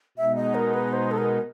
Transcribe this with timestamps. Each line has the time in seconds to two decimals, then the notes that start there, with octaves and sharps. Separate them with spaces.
0.17 B2 G#3 B3 D#4 E5
0.36 D#5
0.55 A#4
0.74 B4
0.93 C5
1.11 A4
1.18 A#4